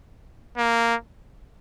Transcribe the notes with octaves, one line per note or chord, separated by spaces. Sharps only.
A#3